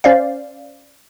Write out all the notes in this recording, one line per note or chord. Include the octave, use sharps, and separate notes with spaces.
C#4 C5 D5 F5